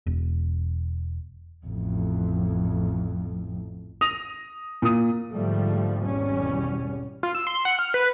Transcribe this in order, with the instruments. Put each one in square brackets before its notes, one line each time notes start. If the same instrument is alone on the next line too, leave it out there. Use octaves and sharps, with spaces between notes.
[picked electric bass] E1
[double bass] A1 F2
[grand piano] D#6 A#6 F7
A#2 D#6
[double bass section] G#2 D3 F3 G3 A3
G#1 E2 B2 G3 C#4
[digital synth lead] F4
E6
C6
F#5
F6
B4